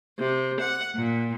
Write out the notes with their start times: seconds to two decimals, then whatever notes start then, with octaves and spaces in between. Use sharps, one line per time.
0.19 C3
0.60 F#5
0.95 A#2